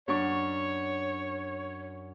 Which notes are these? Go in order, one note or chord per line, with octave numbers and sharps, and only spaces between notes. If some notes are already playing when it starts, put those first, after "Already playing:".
F#2 D4 C#5 C#6